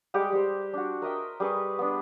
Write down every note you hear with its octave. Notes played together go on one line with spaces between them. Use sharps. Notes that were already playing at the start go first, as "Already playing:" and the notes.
G3 G#3 G4 F#5
G3 C5
D4 F#4
A#4 D#5 E5 G5
G3 G#4 B4 C#6
B3 D4